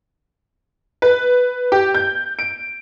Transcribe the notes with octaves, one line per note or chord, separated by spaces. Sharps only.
B4
G4
G6
D7